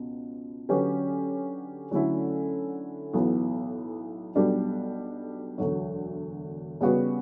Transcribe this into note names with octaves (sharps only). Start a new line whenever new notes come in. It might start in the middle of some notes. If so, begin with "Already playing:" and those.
Already playing: C#2 B2
D3 F#3 C#4 G4 B4
D3 F#3 A3 C#4 E4
B1 A2 E3 B3
B1 B2 G3 D4 A4
E1 D2 D3 F#3
C#3 G3 B3 F#4 B4